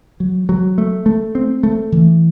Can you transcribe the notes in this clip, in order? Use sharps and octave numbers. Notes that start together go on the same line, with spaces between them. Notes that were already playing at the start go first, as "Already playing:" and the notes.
F#3
F#3
A3
A3
C4
A3
E3